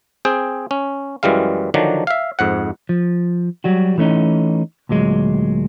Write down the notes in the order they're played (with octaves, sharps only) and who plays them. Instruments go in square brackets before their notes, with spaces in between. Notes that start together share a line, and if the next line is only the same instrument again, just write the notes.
[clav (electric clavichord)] C4 G#4 G5
C#4
F#2 E3 G3 G#3 F5
D3 D#3 F3 F#3 D4
E5 F5
F2 G#2 F#5
[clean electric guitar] F3
F#3 G3 F#4
E3 A3 C#4 D#4
D2 A#2 F#3 G#3